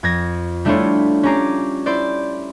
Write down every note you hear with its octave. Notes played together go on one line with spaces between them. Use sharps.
F2 G#6 A#6
G3 A3 D4 E4 F4 C#5
C#4 G4 A#5 D6 C7
E4 C5 D5